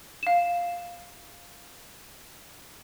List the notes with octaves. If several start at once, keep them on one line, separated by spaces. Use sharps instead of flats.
F5 E7